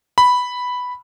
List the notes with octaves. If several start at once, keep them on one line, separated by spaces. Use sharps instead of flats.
B5